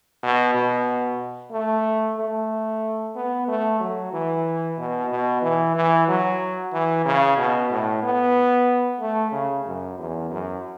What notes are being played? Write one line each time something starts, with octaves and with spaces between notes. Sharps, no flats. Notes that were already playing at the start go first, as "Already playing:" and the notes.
B2
B2
A3
A3
B3
A3
F#3
E3
B2
B2
E3
E3
F#3
E3
C#3
B2
A2
B3
A3
C#3
F#2
E2
F#2